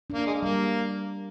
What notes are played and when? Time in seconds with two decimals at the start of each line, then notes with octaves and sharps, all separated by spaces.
0.10 A#3 D4
0.27 G#3
0.43 G3 A#3